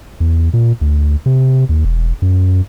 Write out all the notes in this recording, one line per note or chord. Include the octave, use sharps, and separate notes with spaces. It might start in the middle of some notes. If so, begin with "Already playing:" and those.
E2
A#2
D2
C3
D#2
E1
F#2